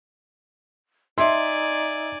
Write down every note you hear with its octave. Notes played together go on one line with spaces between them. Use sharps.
D#4 D5 E5 G#5 C6